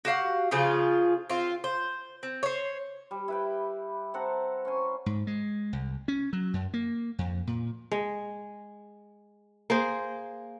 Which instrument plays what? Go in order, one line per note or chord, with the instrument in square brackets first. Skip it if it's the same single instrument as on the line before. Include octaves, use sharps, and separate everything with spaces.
[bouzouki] F#4 G4 F5 F#5
C#3 F3 F4 G#4
C4 F4
C5
C4
C5 C#5
[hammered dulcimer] G3
E4 B4 G5
C4 A4 F#5 A#5
C#4 C5 G#5
[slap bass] G#2
G#3
C2
C#4
F#3
F#2
A#3
F2
A#2
[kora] G#3
A#3 G#4 C5